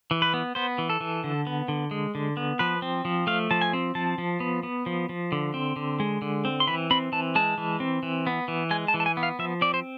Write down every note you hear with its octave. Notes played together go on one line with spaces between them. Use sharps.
E3
B4
B3
B3 C5
E3
A4
E3
D3
B3
D3
G#3
D3
B3
F3 B4
C4
F3
A3 F5
F3 A5
G#5
C4
F3 A5
F3
B3
B3
F3
F3
D3
C4
D3
G#3
D3
C4
C6
E3 B5
C4 B5
E3 A5
G#3 A5
E3
C4
E3
B3
E3
G#3 G#5
A5
E3
A5
G#5
B3
F5
F3 E5
C4 D5
C5